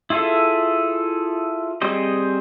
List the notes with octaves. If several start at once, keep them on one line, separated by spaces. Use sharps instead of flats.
E4 F4 G#4 A4 E5
G3 C4 G#4 C5 D#5